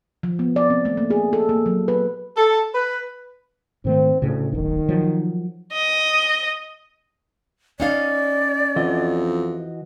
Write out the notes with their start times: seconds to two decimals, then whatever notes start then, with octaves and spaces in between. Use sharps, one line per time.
0.23 F3
0.39 B3
0.56 D5
0.70 C4
0.85 A3
0.97 A#3
1.10 G#4
1.33 A4
1.49 A#3
1.66 F#3
1.88 B4
2.37 A4
2.74 B4
3.85 G#2 D#3 A3 C4
4.22 D2 A2 C#3
4.52 D1 G1 D#3
4.89 F3 F#3
5.73 D#5
7.80 C#4 D#4 D5 F5
8.76 F2 E3 F#4 D#5